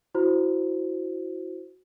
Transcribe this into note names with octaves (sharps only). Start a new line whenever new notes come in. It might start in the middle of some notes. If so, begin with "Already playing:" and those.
E4 F#4 C5